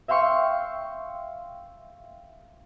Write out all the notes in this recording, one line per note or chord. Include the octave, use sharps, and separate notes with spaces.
E5 F5 G5 C6 C#6 C#7